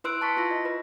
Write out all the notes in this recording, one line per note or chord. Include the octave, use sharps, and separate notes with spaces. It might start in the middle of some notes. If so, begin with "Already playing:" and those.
E4 B4 C6 E6 F#6 D7
A5 C#6 B6
E4 F4 A#6
D#5
B4